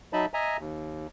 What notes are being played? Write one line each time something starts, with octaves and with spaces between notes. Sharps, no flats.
F#3 D#4 D#5 E5 A5 B5
D#5 E5 G#5 A#5
D#2